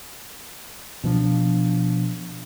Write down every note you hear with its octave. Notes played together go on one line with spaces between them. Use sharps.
B2 F3 D4